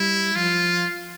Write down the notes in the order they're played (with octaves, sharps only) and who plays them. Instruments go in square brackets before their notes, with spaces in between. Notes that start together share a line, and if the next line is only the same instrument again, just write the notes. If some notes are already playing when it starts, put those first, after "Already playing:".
Already playing: [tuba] G3 [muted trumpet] E4
[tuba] F3 [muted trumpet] F4